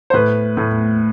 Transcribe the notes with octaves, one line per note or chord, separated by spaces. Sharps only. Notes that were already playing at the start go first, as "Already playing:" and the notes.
C5
A2 B4
A2